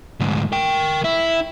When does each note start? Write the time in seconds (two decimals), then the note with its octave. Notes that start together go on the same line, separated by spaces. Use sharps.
0.20 D2 G#2
0.52 A#4 G5
1.04 E4